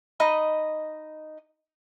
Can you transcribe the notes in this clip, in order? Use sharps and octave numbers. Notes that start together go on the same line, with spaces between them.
D#4 D#5 B5